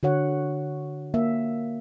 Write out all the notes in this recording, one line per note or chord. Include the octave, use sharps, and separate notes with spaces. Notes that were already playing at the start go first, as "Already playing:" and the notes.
D3 F#4 C#5 F#5
A#3 E5